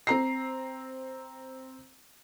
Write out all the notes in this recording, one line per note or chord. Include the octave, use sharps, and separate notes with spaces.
C4 A#5 C7